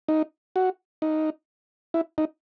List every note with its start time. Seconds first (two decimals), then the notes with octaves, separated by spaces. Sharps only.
0.09 D#4
0.56 F#4
1.02 D#4
1.94 E4
2.18 D#4